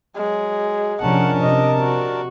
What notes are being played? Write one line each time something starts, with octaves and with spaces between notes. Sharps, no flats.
F#3 G#3
C3 F3 C#4 D4 A#4 F#5 A5
C3 D#5
F#4